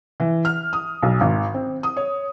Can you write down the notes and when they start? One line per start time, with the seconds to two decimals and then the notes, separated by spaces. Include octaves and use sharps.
0.20 E3
0.45 F6
0.73 D#6
1.02 B1
1.20 G#1
1.54 C4
1.83 D#6
1.96 C#5